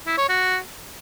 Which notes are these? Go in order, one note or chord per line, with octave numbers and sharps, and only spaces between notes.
E4
C#5
F#4